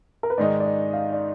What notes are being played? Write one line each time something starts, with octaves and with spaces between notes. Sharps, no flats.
A#4
B4
G#2 D#3 G#3 D#4 D5
D5
D#5
F5
D5